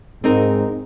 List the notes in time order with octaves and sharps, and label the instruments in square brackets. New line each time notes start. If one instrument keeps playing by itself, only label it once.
[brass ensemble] G#2 [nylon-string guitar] C4 D#4 A#4